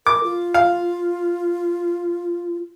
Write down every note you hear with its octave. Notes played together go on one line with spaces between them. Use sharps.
A#4 D6
F4
F5